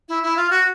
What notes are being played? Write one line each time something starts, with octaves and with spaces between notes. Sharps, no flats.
E4
E4
F4
F#4